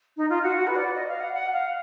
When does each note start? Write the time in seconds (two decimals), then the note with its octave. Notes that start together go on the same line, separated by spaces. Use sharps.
0.17 D#4
0.29 F4
0.43 F#4
0.56 F#4
0.67 B4
0.76 D5
0.95 D#5
1.08 F5
1.20 F#5
1.33 F#5
1.53 F5